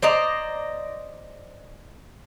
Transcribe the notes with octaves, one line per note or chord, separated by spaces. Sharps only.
C5 D5 D#5 A#5